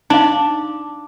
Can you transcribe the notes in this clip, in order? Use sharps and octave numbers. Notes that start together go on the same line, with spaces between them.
D4 D#4 F5